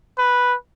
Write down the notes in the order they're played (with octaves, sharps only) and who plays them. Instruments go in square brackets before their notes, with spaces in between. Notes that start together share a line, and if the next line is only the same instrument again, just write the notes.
[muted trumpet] B4